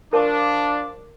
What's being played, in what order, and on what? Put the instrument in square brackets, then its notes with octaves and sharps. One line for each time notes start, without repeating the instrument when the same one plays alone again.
[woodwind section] F3 D6 [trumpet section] D4 [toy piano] A#4 A5 C#6